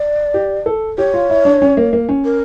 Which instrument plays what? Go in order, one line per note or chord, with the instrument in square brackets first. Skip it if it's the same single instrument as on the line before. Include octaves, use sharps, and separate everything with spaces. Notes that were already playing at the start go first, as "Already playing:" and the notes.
Already playing: [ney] D5
[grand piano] G4
A4
[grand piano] G4 [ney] C#5
[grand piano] F4
E4
D4
C#4
A#3
A#3
C#4
[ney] A#4